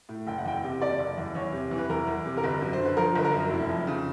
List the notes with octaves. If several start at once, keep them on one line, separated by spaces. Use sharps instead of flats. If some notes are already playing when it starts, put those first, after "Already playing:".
A2
F#1 G5
F#5
E2 G5
C3
F#1 D5
F#1
E2
E2 C#5
C3
E3
B4
E2 A#4
E2
C3
A#4
G1 B4
F#2
C5
D3
B4
F3 A#4
G1 B4
A#4
F#2
F1 E4
F2
C#3